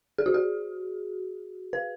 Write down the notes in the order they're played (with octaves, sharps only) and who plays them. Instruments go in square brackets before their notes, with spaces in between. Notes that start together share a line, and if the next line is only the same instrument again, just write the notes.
[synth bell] G#4
F#4
G#4
B4